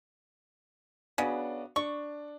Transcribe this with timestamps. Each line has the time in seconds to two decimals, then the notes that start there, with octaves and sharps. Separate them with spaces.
1.18 C#3 B3 D4 F#4
1.76 D4 C#6